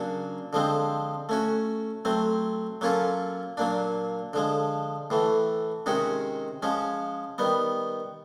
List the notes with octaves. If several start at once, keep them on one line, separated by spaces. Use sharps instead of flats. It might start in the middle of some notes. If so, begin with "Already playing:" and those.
Already playing: C#3 F#3 A#3 D4 F#4
D3 F3 G#3 C4
A3 C#4 F#4
F#3 A3 C4
F#3 A#3 C#4 F4 A4
A#2 F#3 A#3 D4
D3 F3 G#3
A2 E3 A3
C3 D#3 G#3 C#4 F#4
F3 G#3 C#4
D#3 G3 B3